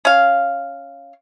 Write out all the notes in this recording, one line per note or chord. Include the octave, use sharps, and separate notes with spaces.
C#4 F5